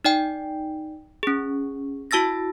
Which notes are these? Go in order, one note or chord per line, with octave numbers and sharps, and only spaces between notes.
D#4 D5 G5
C#4 G#4
E4 F#4 A5 E6 A6 A#6